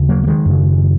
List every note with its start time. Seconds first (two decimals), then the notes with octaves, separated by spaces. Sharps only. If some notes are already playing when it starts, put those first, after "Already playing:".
Already playing: D#2 C#3
0.09 F#3 A#3
0.24 A#3
0.27 D#3 G#3
0.46 F#2 C#3